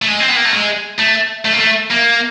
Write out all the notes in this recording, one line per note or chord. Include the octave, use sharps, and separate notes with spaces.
A3
G#3
C4
B3
A#3
A3
G#3
A3
A3
A#3
A3
A#3